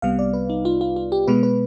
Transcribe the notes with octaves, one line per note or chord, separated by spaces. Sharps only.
C2 C3 G3 B3 F5
D5
B4
D#4
F4
F4
F4
G4
B2 G#3 B3 B4
B4